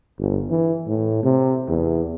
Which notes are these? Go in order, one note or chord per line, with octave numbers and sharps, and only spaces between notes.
G1
E3
A2
C3
E2